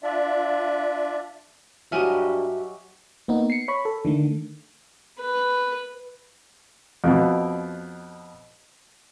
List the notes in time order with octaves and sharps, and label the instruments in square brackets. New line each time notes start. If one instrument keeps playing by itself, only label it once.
[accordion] D4 F4 D5 E5
[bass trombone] G2 [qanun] F#3 G4 D#5 [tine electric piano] F#4 E5 [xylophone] G#5 F6
[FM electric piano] A#3 B3 D#4
C7 C#7
C#5 B5 C#6
A4
D3 D#3 A3
[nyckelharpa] B4
[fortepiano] F2 B2